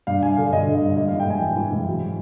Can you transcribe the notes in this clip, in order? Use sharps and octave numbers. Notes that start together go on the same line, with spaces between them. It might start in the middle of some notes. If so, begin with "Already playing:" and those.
G2 F5
G2 G#5
D3 F5
G2 D#5
D3
G2
G#2 D#5
F5
E3
G5
G#2 G#5
E3
E3
G#2
F#3